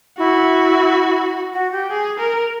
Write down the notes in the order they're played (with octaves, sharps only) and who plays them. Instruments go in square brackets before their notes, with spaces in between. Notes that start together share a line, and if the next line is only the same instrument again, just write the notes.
[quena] E4 [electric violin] F#4
[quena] F#4
G4
[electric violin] G#4
A#4